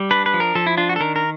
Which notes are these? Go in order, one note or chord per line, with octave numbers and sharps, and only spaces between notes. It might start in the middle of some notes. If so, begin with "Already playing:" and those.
Already playing: G3
D4 B4
B4
F3
A#4
F3 A4
E4
D4 F4
F#4
A4
D#3 A#4
A#4